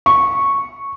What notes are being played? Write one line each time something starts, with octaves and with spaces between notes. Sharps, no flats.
C#6